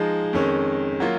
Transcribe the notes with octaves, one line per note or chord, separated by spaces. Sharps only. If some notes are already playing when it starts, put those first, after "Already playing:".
Already playing: F3 G#3 D#4 G#4 D#5
F2 D#3 G#3 C#4
F#3 A#3 F4